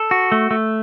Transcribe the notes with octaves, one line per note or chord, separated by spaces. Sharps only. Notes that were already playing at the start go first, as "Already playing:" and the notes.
Already playing: A4
F#4
A3
A3